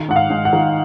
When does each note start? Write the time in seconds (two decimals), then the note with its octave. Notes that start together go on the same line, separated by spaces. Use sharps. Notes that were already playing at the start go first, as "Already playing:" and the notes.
Already playing: D#3
0.08 G#2 F#5
0.16 F5
0.30 G#2
0.45 F#5
0.53 D#3